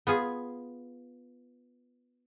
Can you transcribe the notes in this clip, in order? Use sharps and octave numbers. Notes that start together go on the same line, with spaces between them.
B3 F4 G#4